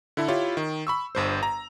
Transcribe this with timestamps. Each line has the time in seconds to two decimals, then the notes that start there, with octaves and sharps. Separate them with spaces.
0.17 D3 E4 A4
0.28 E4 F4 G4 C#5
0.57 D#3
0.87 B5 C#6 E6
1.15 G1 G2 C5
1.43 A#5